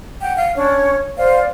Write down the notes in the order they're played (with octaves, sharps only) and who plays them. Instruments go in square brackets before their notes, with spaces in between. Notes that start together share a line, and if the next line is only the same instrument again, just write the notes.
[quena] F#5 [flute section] G5
[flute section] F5
[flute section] C#4 D4 [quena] C#5
[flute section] C5 F5 [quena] D5